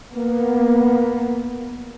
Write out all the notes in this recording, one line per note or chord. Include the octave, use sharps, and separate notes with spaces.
A#3 B3